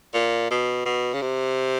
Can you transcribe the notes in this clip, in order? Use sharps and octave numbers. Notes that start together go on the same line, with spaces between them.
A#2
B2
B2
C#3
C3